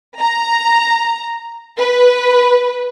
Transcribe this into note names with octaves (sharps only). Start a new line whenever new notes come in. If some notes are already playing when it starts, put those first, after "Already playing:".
A#5
B4